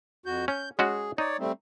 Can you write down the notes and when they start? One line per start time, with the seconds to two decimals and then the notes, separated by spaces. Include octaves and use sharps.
0.26 F2 F#4 G6
0.48 C#4 G6
0.79 G#3 C#4 F#4 G#4
1.18 D#4 C#5 D5
1.39 G3 A3 C4